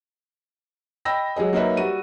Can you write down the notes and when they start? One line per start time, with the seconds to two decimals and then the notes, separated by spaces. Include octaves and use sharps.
1.05 D#5 G5 B5 E6 A#6
1.36 F#3 G#3 G#4 D#5
1.53 F#3 A#3 D#4 B4 E5
1.77 G3 F#4 D#7